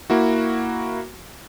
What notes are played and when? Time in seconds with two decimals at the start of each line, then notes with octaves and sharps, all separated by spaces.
0.10 A#3 E4 F#4